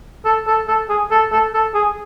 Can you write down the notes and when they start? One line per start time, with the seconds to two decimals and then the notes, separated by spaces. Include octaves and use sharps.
0.25 A4
0.47 A4
0.68 A4
0.89 G#4
1.11 A4
1.32 A4
1.54 A4
1.74 G#4